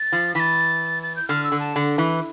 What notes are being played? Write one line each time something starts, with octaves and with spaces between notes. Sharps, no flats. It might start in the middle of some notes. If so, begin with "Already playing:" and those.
Already playing: A6
F3
E3 A6 B6
A6
G6
D3 F6
E6
D3
A5
D3
E3